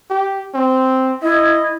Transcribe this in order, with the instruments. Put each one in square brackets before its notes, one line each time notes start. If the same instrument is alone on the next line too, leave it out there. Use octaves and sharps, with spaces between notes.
[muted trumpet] G4
C4
[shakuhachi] E4 [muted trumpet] D#5